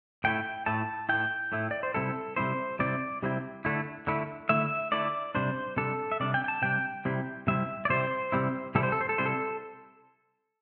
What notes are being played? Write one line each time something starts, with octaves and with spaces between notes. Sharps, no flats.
A2 A3 E4 G5
A2 A3 E4 A5
A2 A3 E4 G5
A2 A3 E4
D5
C5
C3 G3 C4 E4 A4
C3 G3 C4 E4 C5
C3 G3 C4 E4 D5
C3 G3 C4 E4
D3 A3 E4
D3 A3 E4
D3 A3 E4 E5
D3 A3 E4 D5
C3 G3 D4 C5
C3 G3 D4 A4
E5
C3 G3 D4 D5
G5
G5
A5
C3 G3 D4 G5
C3 G3 C4 E4
C3 G3 C4 E4 E5
D5
C3 G3 C4 E4 C5
C3 G3 C4 E4
C3 G3 C4 E4 A4
C5
A4
C5
A4
C3 G3 C4 E4 C5
A4